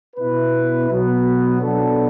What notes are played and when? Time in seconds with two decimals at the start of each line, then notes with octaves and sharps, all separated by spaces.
0.16 B2 B3 E4 B4
0.90 B2 F#3 B3
1.61 B2 F#3 B3 D4 A4